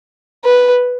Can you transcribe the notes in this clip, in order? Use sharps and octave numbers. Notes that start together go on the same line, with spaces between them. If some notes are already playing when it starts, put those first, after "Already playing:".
B4